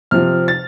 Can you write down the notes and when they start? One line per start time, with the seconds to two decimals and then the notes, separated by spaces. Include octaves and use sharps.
0.11 C3 F3 C4 F6
0.48 A6